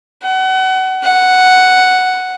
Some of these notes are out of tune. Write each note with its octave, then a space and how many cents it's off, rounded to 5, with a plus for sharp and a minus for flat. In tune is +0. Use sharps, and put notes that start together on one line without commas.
F#5 +30
F#5 +0